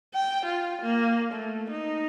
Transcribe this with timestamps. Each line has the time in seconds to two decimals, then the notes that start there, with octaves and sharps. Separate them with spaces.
0.14 G5
0.46 F4
0.82 A#3
1.32 A3
1.70 D#4